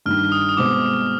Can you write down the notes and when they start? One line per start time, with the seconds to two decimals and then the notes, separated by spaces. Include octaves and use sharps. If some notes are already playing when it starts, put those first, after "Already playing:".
0.06 G2 D#3 G3 F6
0.32 D#6
0.49 D#6
0.57 B2 G#3 C4 D6